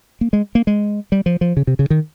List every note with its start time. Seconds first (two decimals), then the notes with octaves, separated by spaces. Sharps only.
0.21 A#3
0.33 G#3
0.55 A#3
0.67 G#3
1.12 G3
1.26 F3
1.41 F3
1.57 C#3
1.67 C3
1.79 C#3
1.90 D#3